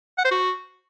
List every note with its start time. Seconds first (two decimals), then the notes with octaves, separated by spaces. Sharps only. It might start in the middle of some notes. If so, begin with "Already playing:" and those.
0.18 F#5
0.24 C5
0.31 F#4